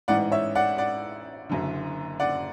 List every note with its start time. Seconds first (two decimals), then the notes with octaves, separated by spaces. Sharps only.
0.08 A1 G#2 E3 D5 F#5
0.31 C#5 E5
0.55 D5 F#5
0.78 D5 F#5
1.49 F#1 F#2 D3
2.20 D5 F#5